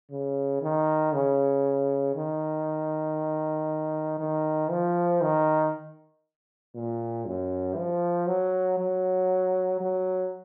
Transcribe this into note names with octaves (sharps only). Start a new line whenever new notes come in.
C#3
D#3
C#3
D#3
D#3
F3
D#3
A#2
F#2
F3
F#3
F#3
F#3